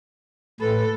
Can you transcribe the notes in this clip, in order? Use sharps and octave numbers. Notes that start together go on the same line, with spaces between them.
A2 A4 B4